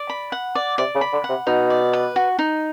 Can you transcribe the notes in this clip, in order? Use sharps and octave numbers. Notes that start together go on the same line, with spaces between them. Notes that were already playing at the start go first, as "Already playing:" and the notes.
Already playing: D5
B5
F#5
D5
C3 D5
C#3
B5
D3
F#5
C3
B2 D#4
D5
B4
F#4
D#4